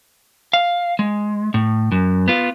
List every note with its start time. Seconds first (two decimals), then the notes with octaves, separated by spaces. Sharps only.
0.53 F5
0.99 G#3
1.54 A2
1.92 F#2
2.28 B3 F4